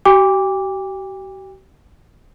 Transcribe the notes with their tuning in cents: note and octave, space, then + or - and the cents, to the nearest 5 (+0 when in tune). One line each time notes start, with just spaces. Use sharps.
G4 -45 G5 +40 D6 -10